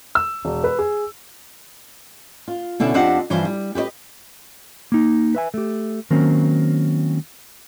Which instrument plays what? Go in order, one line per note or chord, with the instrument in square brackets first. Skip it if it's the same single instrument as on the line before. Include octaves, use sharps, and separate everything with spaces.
[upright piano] E6
E1
B4
G#4
[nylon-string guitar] F4
B2 D3 C#4 E4
F2 C4 D4 G4 D#5 F#5
G2 E3 F3 C5
G3
G4 B4 C5 D#5
[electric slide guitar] A#3 D#4
B4 E5 G#5
A3 G4
D#3 F#3 A#3 C4 C#4